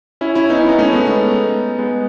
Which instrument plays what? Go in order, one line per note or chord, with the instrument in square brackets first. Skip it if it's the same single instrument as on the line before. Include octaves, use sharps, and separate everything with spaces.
[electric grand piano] C#4 E4
C#4 E4
B3 D#4
C#4 E4
B3 D#4
A3 C#4
G#3 B3
B3 D#4
G#3 B3